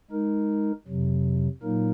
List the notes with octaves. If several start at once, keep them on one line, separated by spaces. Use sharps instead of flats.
G#3 D#4 A#4
F2 C3 F#3
A#2 F#3 A#3 D#4 A#4